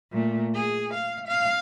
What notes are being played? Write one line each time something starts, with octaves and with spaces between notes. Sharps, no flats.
A#2 A3
G#4
F5
F5